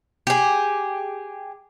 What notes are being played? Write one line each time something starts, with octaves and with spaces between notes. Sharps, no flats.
G4 G#4